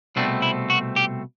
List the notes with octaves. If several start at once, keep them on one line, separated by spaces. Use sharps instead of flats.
C2 B2 A3 C4 D4
E4
F#4
G4